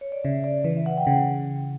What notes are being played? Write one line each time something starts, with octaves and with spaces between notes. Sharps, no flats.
C#5
D5
C#3 E5
D5
E3 B4
E5
F#5
G5
C#3 F#5